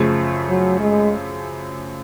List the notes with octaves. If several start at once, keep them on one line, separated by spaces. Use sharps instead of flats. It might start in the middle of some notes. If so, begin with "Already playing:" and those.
Already playing: F#2 C#3 F3 A3
F#3
G#3